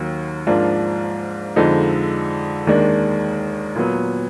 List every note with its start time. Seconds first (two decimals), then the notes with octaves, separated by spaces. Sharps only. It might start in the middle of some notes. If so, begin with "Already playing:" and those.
Already playing: D#2 D#3 F#3
0.47 G#2 F3 A#3 D4 F4
1.56 F2 D3 F3 G#3 D#4
2.67 D#2 D#3 G#3 D4
3.76 A#2 F#3 B3